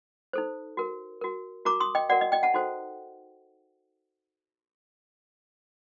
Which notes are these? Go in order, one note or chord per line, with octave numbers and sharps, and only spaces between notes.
D#4 A4 C5
F#4 A#4
F#4 A#4
F#4 A#4 A#5 D6
C6 D#6
D#5 G5
F#4 A#4 D5 F#5
D#5
D#5 G5
F#5 A5
D#4 F#4 A4 C5